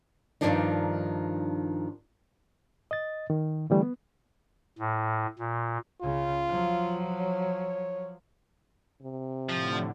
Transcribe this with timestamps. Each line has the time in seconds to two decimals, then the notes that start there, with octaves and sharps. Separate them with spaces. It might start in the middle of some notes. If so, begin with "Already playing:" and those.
0.41 G2 B2 D#3 F3 D4 D#4
2.91 D#5 A6
3.30 D#3
3.70 D3 E3 G3 A3
3.83 B3
4.79 A2
5.39 A#2
6.02 C#2 C#3 F4
6.48 F3 F#3
7.20 C#5
9.02 C3
9.49 A2 D3 F3